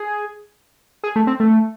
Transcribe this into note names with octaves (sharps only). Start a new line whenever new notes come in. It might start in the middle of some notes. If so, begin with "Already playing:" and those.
Already playing: G#4
G#4
A3
C4
A3